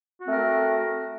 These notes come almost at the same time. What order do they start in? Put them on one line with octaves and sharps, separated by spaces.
F#4 C4 A3 A#4